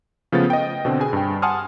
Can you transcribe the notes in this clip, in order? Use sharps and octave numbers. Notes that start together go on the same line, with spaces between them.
C#3 F3 A3 B3 A6
D#5 G5
B2 D3 C4
G#4 B4 G#5
G2 G5
F#5 G#5 A5 C6 D#6 F6